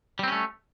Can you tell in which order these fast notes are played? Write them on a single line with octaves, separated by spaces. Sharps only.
G3 C4 C#4 A3